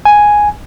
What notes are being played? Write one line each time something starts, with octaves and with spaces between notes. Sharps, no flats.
G#5